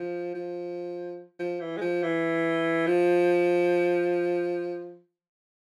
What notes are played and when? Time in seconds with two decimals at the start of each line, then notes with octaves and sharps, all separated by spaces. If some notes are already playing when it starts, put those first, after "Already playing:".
Already playing: F3
0.35 F3
1.39 F3
1.61 E3
1.77 G#3
1.81 F3
2.03 E3
2.87 F3